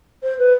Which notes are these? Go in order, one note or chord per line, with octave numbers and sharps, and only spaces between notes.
C5
B4